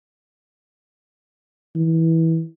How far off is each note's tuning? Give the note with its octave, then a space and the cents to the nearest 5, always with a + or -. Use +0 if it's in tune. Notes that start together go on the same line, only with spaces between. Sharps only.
E3 -20